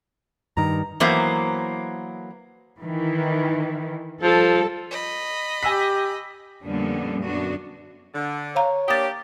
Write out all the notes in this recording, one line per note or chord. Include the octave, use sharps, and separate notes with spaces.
G2 D#3 A#5
E3 F#3 A#3 B3 C5
D#3 E3
F3 G3 A4
D#5 B5
G4 G#5 E6 B6
F2 A#2 D3 G3 B3 C#4
F#2 D3 B3 D4 F#4
D3
C#5 F5 A#5
A#3 D4 G4 D#6 A6